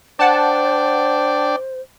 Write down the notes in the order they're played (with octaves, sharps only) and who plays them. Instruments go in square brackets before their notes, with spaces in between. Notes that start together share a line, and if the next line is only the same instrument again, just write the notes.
[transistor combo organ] D4 D5 G5 [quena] C5 [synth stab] F#5 A5